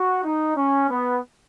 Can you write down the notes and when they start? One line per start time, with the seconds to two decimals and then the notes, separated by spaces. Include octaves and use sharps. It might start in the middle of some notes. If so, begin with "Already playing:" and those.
Already playing: F#4
0.24 D#4
0.57 C#4
0.90 B3